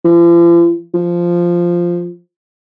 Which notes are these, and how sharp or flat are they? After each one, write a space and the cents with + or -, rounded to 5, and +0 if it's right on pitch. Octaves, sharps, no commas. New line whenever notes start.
F3 -45
F3 -5